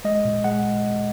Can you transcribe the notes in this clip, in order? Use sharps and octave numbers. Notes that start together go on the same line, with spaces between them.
G#3 D#5
A#2
G#3 F#5